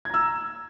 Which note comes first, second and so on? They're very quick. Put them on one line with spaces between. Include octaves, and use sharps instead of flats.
G#6 A#5 E6